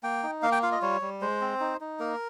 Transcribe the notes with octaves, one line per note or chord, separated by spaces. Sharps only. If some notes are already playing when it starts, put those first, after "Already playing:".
A#3 G5
D#4
A#3 F5
G5
F4 F5
D#5
G3 C#5
G3
G#3 C5
C4
D#4
D#4
A#3 A#4